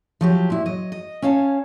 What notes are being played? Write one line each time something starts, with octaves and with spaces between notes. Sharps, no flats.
F3 F#3 G4
A#2 E4
F#3 D#5
D#5
C#4 C#5 F5 A5